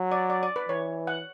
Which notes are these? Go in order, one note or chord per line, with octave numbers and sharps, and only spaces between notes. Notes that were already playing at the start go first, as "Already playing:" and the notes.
Already playing: F#3
D5
D5
D5
B4
E3 C#5
F#5